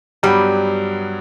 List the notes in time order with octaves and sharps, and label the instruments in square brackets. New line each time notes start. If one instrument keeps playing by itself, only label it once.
[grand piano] G2 F#3 B3 [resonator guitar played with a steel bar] G3